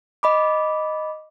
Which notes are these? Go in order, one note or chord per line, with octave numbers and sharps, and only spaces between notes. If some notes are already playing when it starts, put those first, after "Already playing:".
D#5 B5 D6